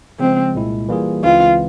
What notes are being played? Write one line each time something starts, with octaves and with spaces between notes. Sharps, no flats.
C#3 F3 G#3 C4
C2 A#2 G#3 E4
E3 G3 A#3 F4 G#4
C#2 C#3 E3 G#3 C4 F4